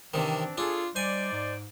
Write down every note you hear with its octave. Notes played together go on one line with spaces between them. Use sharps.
C3 D#3 E3 C4 D4
D4 F4 G#4 A4
G3 D#4 C5 D5 G#5
G#2